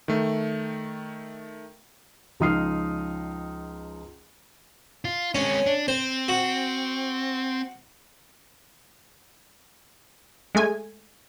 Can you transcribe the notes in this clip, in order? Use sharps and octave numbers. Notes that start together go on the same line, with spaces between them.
D#3 A3
C#2 F3 D#4 D#6 F6 C7
F4
G#3 C4 C#4
D4
C4 C5
F#4
G#3 A3 G#5